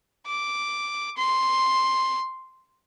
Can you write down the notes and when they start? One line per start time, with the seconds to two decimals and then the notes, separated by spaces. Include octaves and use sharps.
0.26 D6
1.17 C6